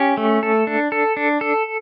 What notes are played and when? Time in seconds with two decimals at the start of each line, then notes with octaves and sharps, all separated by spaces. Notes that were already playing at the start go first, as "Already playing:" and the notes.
Already playing: C#4 G4
0.17 A3
0.43 A4
0.67 D4
0.92 A4
1.17 D4
1.41 A4